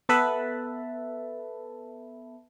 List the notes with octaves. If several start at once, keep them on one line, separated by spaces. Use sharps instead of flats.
B3 A4 B4 E5 A5 B5